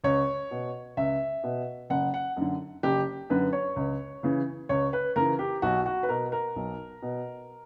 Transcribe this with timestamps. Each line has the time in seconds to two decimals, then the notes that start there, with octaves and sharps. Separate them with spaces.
0.04 C#2 C#5
0.51 B2
0.97 C#2 E5
1.44 B2
1.90 F#1 F#5
2.14 F#5
2.37 F#2 D3
2.83 F#1 G4
3.30 F#2 D3 B4
3.53 C#5
3.76 C#2
4.23 C#3 E3
4.69 C#2 C#5
4.93 B4
5.16 C#3 E3 A#4
5.39 G4
5.62 B1 F#4
5.86 F#4
6.03 B4
6.09 B2 A#4
6.32 A#4
6.56 B1
7.02 B2